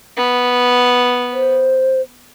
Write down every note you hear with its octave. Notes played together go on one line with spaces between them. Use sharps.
B3
C5